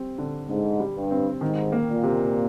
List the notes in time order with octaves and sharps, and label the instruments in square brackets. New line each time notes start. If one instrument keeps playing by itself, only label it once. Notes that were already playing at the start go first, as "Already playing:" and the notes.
Already playing: [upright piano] G3 C4
D3
[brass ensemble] G#2 [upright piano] D3
[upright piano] G3
[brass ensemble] G2
[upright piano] C4
[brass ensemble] G#2 [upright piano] D#3
[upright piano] A#3
[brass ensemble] A#2
[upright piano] C3